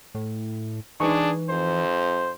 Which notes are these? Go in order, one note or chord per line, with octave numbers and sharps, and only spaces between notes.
A2
E3 D4 D#4 G#4 B4 C#6
F2 C5